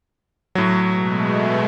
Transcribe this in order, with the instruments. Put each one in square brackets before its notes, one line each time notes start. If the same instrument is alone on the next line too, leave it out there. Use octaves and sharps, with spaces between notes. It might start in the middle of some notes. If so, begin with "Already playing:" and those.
[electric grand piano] A2 F#3
[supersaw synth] B2 G#3 A3